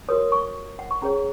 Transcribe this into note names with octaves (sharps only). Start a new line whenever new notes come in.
F#4 A#4 C#5 D#6
C#6
F#5
C#6
C#4 G#4 C#5 A#5